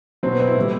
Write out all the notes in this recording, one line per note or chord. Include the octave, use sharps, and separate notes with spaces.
B2 F#3 C4
B3
C4
E4
A2 G3